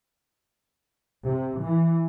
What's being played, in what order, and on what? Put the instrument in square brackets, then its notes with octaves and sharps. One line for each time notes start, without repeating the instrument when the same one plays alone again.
[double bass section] C3
E3